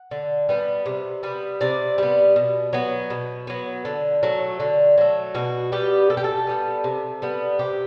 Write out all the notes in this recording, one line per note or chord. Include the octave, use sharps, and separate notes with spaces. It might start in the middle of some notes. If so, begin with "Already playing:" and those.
Already playing: F#5
D3
G3 B3
C3
G3 B3
C3 D5
G3 B3
B2
F#3 B3
B2
F#3 B3
D3
F#3 A3
D3
F#3 A3
B2 F#4
G3 B3 G4
B2 A4
G4
A4
G3 B3
C3
G3 B3
C3 G4